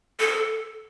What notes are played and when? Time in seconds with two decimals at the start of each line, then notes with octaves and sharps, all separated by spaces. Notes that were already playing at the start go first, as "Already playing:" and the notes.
0.20 A4